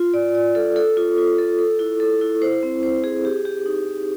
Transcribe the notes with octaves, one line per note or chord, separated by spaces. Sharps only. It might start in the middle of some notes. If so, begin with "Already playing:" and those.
Already playing: F4
D5
D5
A4
A4
F4
F4
A4
A4
E4
A4
E4
C5
C4
C5
G#4
G4
G4
D#4